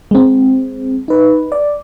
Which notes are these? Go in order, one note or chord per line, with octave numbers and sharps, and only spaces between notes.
G#3 C4
D#4 B4
D5